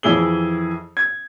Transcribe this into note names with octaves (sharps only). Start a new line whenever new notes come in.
F2 E3 E4 G#4 G7
G#6